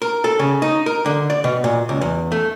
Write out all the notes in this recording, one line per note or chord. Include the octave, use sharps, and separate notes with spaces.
A#4
A4
C#3
D#4
A#4
D3
D5
B2
A#2
C#2
E2
A3